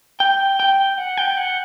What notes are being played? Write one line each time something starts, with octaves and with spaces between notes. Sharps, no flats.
G5
G5
F#5
G5
F#5